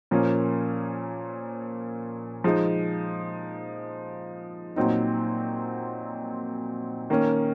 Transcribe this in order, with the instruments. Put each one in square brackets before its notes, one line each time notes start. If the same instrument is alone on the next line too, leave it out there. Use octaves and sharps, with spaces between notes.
[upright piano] A#2 F3 A#3 C#4
F3 G#3 D#4
A#2 F#3 C4 D#4
D#3 A#3 C#4